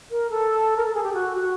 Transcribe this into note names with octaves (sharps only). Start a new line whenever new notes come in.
A#4
A4
A#4
A4
G#4
G4
F#4
G4
F#4